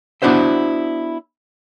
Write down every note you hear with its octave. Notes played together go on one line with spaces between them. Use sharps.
B3 D4 E4 F#4 C5 E5